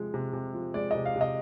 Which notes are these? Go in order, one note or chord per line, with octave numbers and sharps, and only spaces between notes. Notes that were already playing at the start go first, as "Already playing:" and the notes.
Already playing: C3 F3 G#3
C3
C3
F3
G#3 D5
D#5
C3
F5
C3
D#5